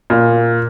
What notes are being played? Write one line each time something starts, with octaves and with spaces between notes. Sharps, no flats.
A#2